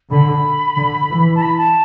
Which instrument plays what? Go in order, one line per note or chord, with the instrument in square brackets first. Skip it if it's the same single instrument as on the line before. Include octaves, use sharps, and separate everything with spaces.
[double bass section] D3 [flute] B5
[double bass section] D3
E3
[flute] A5
B5
A5